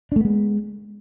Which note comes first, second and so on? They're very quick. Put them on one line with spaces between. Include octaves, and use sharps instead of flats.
D4 A3 B3 G#3